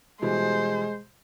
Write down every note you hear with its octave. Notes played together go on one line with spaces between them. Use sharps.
B2 E3 G3 G#3 C5